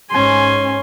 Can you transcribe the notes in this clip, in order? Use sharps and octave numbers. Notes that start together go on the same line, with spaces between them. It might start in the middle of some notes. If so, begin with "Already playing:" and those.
G#2 C#4 G#5 C6